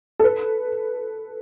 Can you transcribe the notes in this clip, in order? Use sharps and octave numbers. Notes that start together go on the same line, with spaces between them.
A4
B4